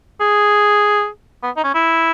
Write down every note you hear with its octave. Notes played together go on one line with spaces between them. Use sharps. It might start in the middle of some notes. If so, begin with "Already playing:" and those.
G#4
B3
D#4
C#4
E4